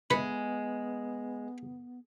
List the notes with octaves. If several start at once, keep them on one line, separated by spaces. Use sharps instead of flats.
G#3 B3 B4